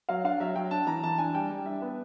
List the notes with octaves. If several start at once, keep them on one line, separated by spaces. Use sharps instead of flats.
F#3 F5
D4 F5
F#3 E5
F#3 G5
D4 A5
E3 A#5
E3 A5
D4 G#5
G3 G5
G3
D4 E5
B3